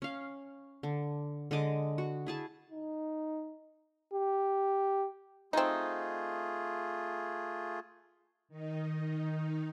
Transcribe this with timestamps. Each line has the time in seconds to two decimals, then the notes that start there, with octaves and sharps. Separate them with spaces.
0.02 C#4 F5
0.83 D3
1.51 D3 G#3 D#5 D6
1.98 F#4
2.27 E4 G#4 A5
2.70 D#4
4.14 G4
5.53 A3 C4 D#4 F4 G#4
8.48 D#3 D#4